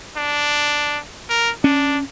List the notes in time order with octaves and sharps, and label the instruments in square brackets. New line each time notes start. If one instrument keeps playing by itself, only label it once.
[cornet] D4
A#4
[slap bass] C#4 [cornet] D4